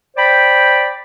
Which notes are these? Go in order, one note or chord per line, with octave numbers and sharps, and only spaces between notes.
C5 D5 G5 B5